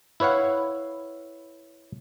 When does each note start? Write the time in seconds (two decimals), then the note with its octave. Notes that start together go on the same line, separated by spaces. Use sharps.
0.20 E4 B4 C#5 F5 F#5